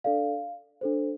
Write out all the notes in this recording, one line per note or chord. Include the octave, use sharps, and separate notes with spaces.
D4 A4 D5 F5
D4 A4 C5